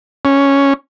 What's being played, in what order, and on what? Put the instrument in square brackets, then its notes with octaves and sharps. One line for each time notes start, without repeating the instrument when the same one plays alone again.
[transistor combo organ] C#4